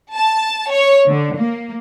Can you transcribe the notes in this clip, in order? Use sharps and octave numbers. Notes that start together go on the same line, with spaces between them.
A5
C#5
D3
A#3